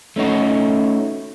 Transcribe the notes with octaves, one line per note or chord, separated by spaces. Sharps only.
A3 C#4 D#4 F#4